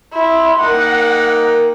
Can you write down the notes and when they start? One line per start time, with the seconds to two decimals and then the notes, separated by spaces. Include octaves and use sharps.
0.13 E4 C6
0.60 A#3 D#4 A#4 F#5 G5